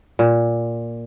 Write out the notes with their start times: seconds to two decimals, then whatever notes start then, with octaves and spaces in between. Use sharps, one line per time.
0.19 A#2